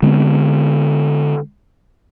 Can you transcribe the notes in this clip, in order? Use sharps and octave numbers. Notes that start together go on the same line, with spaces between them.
D3 G#3 B3 C4